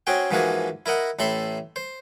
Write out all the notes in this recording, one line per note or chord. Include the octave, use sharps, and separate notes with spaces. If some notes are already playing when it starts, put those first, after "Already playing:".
C4 C#4 F#4 G#4 G5
G#2 E3 F3 A#3 F#4 G#4
E4 A#4 D#5 F#5
A1 A2 A4 E5 B5 C6
C5